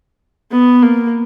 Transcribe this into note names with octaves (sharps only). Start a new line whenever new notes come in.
B3
A#3